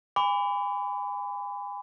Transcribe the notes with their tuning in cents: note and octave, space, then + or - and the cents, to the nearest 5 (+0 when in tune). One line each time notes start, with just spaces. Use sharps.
G#5 -35 B5 +30 D6 -30